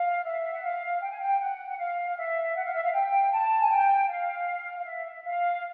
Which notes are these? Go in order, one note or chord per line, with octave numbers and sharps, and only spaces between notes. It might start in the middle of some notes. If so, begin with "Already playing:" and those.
Already playing: F5
E5
F#5
F5
G5
G#5
G5
F#5
F#5
F5
E5
F#5
F5
E5
F5
G5
A5
G#5
G5
F5
F5
E5
E5
F5